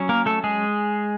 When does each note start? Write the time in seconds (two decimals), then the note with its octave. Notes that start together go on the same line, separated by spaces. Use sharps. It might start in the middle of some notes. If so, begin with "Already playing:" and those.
Already playing: F#3 C#4
0.09 A#3 A#4
0.26 A3 A4
0.44 G#3 G#4